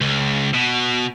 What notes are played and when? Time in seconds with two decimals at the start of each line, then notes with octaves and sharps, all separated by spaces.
0.01 C#2
0.54 B2